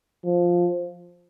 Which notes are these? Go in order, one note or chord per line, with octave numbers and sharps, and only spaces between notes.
F3